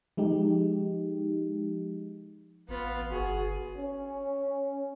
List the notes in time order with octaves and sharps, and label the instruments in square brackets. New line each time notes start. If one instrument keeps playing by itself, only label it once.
[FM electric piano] F3 G#3 D#4 G4
[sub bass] A1 [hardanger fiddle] B3 F4
[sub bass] G1 [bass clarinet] F#4 [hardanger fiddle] G#4
[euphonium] C#4